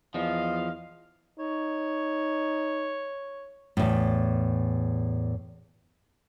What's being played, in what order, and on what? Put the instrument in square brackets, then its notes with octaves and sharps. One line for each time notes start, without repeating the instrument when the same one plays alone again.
[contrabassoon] E2 [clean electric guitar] F3 [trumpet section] D#5 F5
[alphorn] D#4 [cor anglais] C#5
[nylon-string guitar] E2 A2